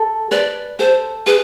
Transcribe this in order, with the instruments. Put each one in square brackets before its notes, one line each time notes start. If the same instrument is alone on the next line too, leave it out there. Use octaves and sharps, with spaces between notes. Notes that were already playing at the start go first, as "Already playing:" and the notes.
Already playing: [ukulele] A4
[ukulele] B4 [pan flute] D5
[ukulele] A4 [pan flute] C5
[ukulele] G#4 [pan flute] B4